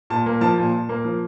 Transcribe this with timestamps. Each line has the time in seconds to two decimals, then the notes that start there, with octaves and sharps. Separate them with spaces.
0.10 A#2 A5
0.26 A#3
0.41 F3 A5
0.58 A#2
0.73 A#2
0.89 A#3
1.05 F3